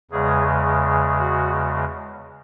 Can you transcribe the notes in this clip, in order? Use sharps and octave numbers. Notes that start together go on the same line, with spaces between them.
E2 C#3 G#3 G#4
F#4